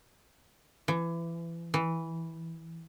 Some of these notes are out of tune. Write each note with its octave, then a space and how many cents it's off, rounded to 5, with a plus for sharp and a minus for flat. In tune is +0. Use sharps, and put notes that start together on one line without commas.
E3 +25
E3 -10